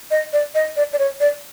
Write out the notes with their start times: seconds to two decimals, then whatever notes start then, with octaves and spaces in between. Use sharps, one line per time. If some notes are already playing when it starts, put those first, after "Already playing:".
0.11 D#5
0.33 D5
0.55 D#5
0.77 D5
0.93 D5
0.99 C#5
1.20 D5